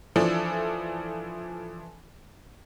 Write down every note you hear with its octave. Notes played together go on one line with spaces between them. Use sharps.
E3 F3 D4 A4